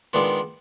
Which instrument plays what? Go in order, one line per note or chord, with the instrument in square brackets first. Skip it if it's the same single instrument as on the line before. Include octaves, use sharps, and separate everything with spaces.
[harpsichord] D#3 G#3 B3 D4 F4